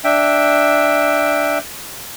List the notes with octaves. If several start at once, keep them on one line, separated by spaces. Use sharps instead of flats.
D4 E5 G5